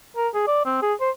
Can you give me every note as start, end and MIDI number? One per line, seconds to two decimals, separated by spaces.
0.17 0.28 70
0.34 0.45 68
0.47 0.64 74
0.65 0.81 60
0.82 0.94 68
1.01 1.10 72